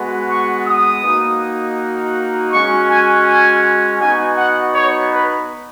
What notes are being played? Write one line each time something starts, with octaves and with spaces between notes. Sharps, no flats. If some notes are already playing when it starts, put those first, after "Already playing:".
Already playing: G#3 B3 F#4
C#6
D#6
A#3 D#4 F#4
G#3 C#4 F#4 C#6
G#5
G#5
B3 D#4 F#4 G#5
F#5
C#5
B4